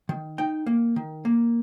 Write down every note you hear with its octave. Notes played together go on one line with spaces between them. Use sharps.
D#3
D#4 G5
A#3
D#3
A#3